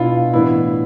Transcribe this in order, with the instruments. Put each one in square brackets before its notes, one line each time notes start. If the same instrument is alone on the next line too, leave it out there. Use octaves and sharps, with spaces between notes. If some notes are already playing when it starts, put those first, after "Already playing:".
Already playing: [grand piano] B2 B3 D4 E4 F4
A2 E3 B3 D4 E4